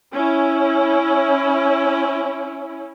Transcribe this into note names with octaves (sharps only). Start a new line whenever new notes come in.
C#4 E4